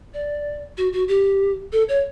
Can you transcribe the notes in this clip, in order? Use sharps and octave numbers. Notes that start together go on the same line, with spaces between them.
D5
F#4
F#4
G4
A4
C#5